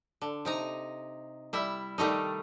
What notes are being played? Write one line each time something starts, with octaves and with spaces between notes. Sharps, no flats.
D3
C3 D#4 A#5
G3 E4 E5
D#3 G3 A3 D#4